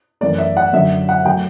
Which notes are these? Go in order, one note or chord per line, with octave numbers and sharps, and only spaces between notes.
F#2 E3 A3 D5
E5
F#5
F#2 D3 F#3 E5
F#5
F#3 A3 G5